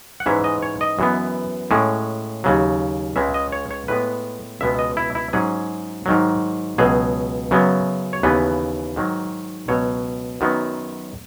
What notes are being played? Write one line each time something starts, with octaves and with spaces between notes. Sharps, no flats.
F#5
G#2 E3 G#3 C#4 E5
D#5
C#5
D#5
F#2 E3 B3
A2 G#3 C#4
D#2 C#3 F#3
C#2 C#3 G#3 E5
D#5
C#5
C#5
A2 G#3 B3 B4
C#2 B2 G#3 B3 E5
D#5
E4
E4
G#2 F#3 C#4 G#4
G#2 D#3 F#3
C#2 B2 F#3 G#4
F#2 C#3 F#3 B3
C#5
D#2 C#3 E3 B3 B4
G#2 D#3 F#3
C#2 B2 F#3 C#5
F#2 D#3 F#3 B3